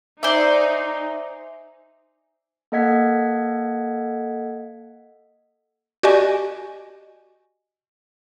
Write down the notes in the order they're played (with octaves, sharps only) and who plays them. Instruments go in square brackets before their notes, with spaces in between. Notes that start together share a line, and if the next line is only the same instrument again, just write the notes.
[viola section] D#4 [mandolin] C5 D5 [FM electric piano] E5 G#5 A#5
[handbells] A#3 A4 D#5 F#5 G#6 B6
[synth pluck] F#4 G4 D5 D#5 G#5